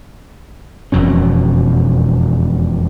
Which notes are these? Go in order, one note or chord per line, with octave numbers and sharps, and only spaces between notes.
E1 F2 B2 C#4